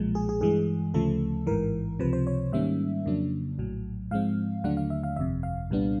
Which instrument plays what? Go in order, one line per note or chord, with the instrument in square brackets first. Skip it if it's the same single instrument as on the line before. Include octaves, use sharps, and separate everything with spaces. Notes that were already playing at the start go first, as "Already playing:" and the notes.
Already playing: [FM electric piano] B1 A#2 F3 G#3
G#4
G#4
G2 E3 G#3 G#4
D2 C#3 F3 A3 A4
A1 G#2 E3 A#4
C#2 C3 F3 B4
C5
C#5
G#2 D#3 G3 A#3 C#4 E5
F2 C#3 F#3 A#3 D4
A#1 A2 F#3
G#2 F3 G#3 C4 F5
D#2 D3 F#3 A3 D4 F#5
F5
E5
F5
G1 F2 C3 E5
F5
C2 A#2 G3 B3 D4